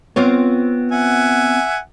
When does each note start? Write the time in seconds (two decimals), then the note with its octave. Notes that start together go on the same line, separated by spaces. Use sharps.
0.16 B3 C4 F4 C#5
0.92 E5 F#5 G#5